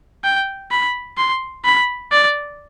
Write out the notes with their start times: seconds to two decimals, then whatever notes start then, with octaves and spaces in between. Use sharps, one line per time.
0.24 G5
0.71 B5
1.17 C6
1.64 B5
2.12 D5